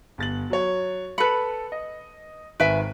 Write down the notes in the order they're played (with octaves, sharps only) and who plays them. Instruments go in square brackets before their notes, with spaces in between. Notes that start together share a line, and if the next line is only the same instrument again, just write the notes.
[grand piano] G1 A6 F#7
F#3 C#5
[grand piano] A4 C#7 [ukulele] B4 B5
[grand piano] D#5
[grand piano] G#1 D#3 D7 [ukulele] B4 E5 G#5